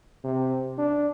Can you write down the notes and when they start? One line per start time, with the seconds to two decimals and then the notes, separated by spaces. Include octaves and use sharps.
0.24 C3
0.78 D4